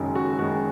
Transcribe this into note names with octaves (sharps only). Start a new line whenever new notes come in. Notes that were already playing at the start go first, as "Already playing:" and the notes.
Already playing: F#1 F#2 D#3 G#3
F#4
F#1 F#2 D#3 G#3 F#4